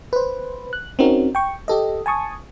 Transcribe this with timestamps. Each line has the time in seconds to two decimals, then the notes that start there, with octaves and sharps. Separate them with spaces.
0.13 B4 C5
0.73 F#6
0.99 C4 C#4 D#4 F#4 A#4
1.35 G5 C#6
1.68 G4 A4 D#5
2.06 G#5 A5 C#6 D#6